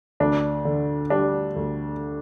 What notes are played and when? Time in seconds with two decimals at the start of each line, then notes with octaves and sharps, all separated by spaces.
0.20 D2 D4
0.65 D3
1.10 G3 D4
1.56 D2